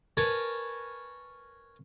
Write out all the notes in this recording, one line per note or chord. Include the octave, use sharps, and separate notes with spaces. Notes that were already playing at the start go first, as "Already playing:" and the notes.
A#4 B4 C#5 G#5 A5